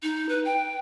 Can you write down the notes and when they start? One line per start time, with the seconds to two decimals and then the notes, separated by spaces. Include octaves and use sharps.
0.03 D#4
0.29 B4
0.45 G5